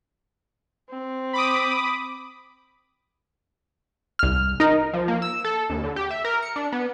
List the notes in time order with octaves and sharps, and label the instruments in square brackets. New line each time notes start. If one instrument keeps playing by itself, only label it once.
[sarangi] C4
[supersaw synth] B5 D6 D#6
[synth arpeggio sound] C2 F6
D#4 A#4
[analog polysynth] F3
A#3
E6
A4
D#2
D3
G4
E5
A#4
C#7
D4
B3